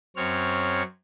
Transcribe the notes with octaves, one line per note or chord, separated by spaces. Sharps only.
F#2 C4 C#5 F6